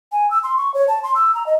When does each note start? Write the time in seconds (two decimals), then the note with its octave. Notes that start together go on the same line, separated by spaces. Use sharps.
0.12 G#5
0.31 E6
0.43 C6
0.57 C#6
0.74 C#5
0.88 A5
1.03 C6
1.15 E6
1.35 A#5
1.47 D#5